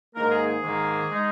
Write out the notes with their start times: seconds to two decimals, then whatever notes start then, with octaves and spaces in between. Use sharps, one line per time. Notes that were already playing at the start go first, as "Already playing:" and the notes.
0.15 G#2 D#3 A#3 A#4
0.31 G#4
0.47 G#4
0.63 G#2 D#3 A#3
1.11 G#3 D#4